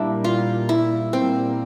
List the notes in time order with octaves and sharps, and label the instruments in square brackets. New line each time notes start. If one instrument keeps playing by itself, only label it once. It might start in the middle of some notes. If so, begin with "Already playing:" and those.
Already playing: [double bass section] A#2 G3 A#3 [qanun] D4 E4
[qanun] F4
E4
[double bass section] A#2 G3 A#3 [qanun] C4